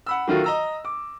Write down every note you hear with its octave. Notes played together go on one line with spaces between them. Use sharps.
F#5 B5 E6
D#3 F#3 A3 F4 F#4 A#4
D#5 A#5 E6
D6